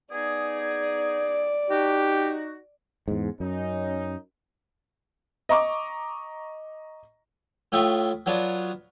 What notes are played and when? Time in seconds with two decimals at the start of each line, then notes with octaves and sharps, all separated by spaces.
0.12 B3 D#4 G#4 D5
1.70 D#4 F#4 G4
3.08 E2 G#2
3.40 F#2 C#4 D#4
5.49 D#5 A#5 C#6 D6
7.72 A2 F4 E5 G5 C#6 D#6
8.26 F#3 B3 D4 F4